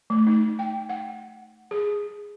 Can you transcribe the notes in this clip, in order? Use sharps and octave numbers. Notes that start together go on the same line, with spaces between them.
A3
D#4
G5
F#5
G#4